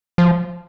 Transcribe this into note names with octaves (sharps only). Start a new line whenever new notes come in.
F3